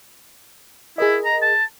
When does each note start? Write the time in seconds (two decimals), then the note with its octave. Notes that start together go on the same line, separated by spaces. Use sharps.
0.98 E4 G#4 A#4 D#5
1.25 A#5
1.42 A5